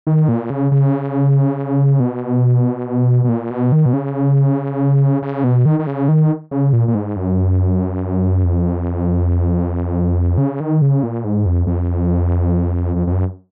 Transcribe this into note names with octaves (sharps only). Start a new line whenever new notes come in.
D#3
A#2
C#3
C#3
B2
B2
A#2
B2
D#3
B2
C#3
C#3
B2
D#3
D#3
C#3
D#3
C#3
A#2
A#2
G#2
F#2
F2
C#3
D#3
C#3
A#2
G#2
F2
F2
F2
F2
F#2